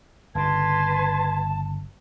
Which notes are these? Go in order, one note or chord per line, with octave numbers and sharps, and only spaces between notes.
G1 C#3 B4 A5 C6 G#6